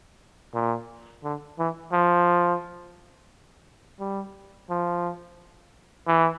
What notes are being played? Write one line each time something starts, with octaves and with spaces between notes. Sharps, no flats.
A#2
D3
E3
F3
G3
F3
E3